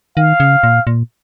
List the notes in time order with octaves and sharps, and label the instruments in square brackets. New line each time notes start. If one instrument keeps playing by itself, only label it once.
[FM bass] D#3 [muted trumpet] F5
[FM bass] C#3
A#2
A#2